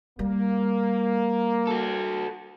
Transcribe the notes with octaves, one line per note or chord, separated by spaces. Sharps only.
G3 A#3
F#4 A4